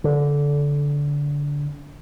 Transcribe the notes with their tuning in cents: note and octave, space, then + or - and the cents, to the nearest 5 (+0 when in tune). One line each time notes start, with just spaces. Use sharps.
D3 -20